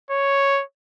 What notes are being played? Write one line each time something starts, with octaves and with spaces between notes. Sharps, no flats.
C#5